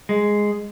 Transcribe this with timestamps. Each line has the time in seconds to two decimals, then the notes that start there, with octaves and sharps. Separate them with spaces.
0.09 G#3